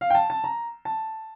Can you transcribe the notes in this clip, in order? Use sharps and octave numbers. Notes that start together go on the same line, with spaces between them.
F5
G5
A5
A5
A#5
A5